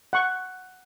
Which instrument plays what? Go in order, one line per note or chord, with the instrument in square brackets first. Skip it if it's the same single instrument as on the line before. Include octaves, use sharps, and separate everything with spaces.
[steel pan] F#5 C#6